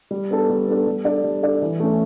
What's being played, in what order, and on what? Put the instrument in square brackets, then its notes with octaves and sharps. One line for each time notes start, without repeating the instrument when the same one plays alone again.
[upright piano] G3
B3 D4 A4
G3
B3 D4 A4
G3
D4 A4 D5
G3
D4 A4 D5
E3
A3 C#4